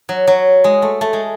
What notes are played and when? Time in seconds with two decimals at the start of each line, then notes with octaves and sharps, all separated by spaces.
0.09 F#3
0.27 F#3
0.64 G#3
0.82 A3
1.01 A3
1.13 G#3